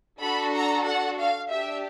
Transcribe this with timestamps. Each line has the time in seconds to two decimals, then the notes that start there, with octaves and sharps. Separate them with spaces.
0.22 D4 F#4 A4 B5
0.55 A#5
0.86 F#5
1.18 F5
1.51 D4 G4 E5